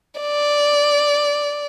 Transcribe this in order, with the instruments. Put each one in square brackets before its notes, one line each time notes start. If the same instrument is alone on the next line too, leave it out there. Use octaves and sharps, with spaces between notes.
[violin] D5